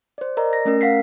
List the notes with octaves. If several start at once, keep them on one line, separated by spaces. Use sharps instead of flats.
C5 D5
A#4 D5 D#5 A#5
A#6
A3 C#4 A#4
F5 F#5 B6 C7